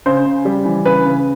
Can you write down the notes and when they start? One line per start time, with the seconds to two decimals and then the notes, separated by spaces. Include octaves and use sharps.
0.06 C#3 C5
0.26 C#3
0.45 G3
0.65 E3
0.86 C#3 B4
1.05 C#3